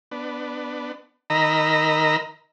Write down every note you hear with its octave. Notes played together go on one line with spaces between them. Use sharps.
B3 D4
D#3 A#4 D#5 A#5 B5 E6